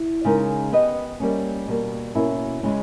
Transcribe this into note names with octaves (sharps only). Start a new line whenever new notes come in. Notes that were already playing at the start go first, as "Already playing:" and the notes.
Already playing: E4
C#3 G#3 D#4 A#4
B3 G4 B4 D#5
G3 A#3 C#4
B2 G3 A#3
B2 A#3 C#4 E4
C#3 G#3 C#4 E4